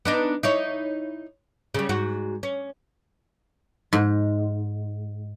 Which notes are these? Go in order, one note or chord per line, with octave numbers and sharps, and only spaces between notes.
B3 D4 D#4
D#4 E4 C#5
C#3 G3
G#2 F#4
C#4
G#2